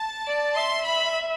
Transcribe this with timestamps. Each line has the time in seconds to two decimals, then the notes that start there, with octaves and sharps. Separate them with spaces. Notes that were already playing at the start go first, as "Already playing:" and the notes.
Already playing: A5
0.27 D5
0.56 E5 C6
0.84 B5